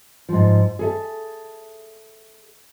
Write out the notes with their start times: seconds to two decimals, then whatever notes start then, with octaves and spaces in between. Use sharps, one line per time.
0.29 G#2 F3
0.79 G#4 A4 E5